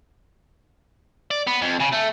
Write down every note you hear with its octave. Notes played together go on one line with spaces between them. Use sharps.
D5
B3
F2
C#3
A3